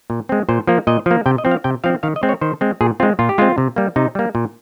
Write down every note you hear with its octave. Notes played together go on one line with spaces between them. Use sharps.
A#2
G#3 C4
A#2 C5
F3 A#3
A#2 D#5
F3 A#3
C3 G5
D#5
F3 C4
F5
C3 G5
F3 C4 F5
D#3 F5
D#5
G#3 C4
C#5
D#3 C5
G#3 C4
A#2 G#4
G#3 C4 F4
A#2 F4
G4
G#3 C4 F4
C3
G3 A#3
C3 D#4
G3 A#3
A#2